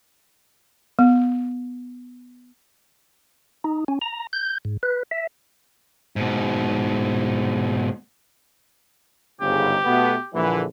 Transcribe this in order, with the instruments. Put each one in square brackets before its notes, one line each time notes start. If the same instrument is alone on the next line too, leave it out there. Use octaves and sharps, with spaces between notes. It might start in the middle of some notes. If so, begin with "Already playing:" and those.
[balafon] B3
[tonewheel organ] D#4
C#4
A#5
G6
G#2
B4
E5
[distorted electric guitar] G#2 B2
[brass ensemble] G1 G#2 C#3 [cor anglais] G4
[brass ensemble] B2 A3 B3
A#1 D3 E3